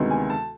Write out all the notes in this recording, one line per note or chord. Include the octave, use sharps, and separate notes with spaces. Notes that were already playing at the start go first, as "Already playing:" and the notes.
Already playing: D2 C3 D#3 G#3 B3
G#5
A5